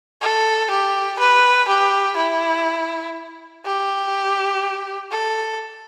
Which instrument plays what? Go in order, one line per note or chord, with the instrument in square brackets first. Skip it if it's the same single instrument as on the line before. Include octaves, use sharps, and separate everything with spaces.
[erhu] A4
G4
B4
G4
E4
G4
A4